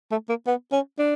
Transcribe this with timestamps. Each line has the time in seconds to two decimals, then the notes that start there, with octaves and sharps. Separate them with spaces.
0.11 A3
0.29 A#3
0.47 B3
0.72 C#4
0.99 D4